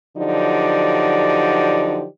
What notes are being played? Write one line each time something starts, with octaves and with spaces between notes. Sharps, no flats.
D3 F3 F#3 D#4 G4 D5